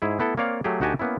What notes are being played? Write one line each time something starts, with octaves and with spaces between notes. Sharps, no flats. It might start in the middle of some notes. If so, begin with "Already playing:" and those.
G#2 E4 G#4
A3 B3 E4 A4
A#3 C4 C#5 D5 F5
F#3 A3 G4 G#4
D2 D#4 F#4 G4 G#5 A5
A#3 B3 C#4 E4